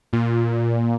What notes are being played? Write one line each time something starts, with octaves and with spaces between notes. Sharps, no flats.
A#2